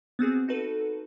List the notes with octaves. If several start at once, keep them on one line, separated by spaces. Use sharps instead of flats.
B3 C4 F#4 G#4
D#4 F#4 A4 B4